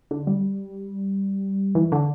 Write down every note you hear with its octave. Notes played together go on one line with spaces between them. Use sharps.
D3
G3
E3
D3